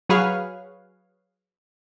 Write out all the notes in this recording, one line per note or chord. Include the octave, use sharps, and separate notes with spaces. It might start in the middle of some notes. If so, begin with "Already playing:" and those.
F#3 F#4 G#4 B4 C#5 F5